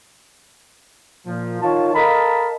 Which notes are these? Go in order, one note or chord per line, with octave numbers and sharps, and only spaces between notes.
A#2 F3
D#3 F4 C#5 A5
A4 A#4 D#5 F5 A5 B5